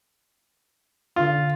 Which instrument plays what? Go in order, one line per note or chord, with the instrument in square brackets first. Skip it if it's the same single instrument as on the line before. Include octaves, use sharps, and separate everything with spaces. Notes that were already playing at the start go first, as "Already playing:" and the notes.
[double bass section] D3 [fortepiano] F4